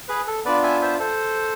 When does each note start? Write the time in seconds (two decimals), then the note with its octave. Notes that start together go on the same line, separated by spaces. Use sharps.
0.09 G#4 B4
0.27 A4
0.45 B3 D4 F4 B4 D5
0.63 E5 G#5
0.82 C5 E5
1.00 A4 C5